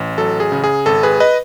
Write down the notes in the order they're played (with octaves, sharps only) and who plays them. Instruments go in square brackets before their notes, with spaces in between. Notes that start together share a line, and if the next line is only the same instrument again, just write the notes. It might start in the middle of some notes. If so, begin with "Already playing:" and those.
Already playing: [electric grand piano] A1
F#3 A4
G#4
C#3
G#4
G#1 A4
G#4 B4
B4 D#5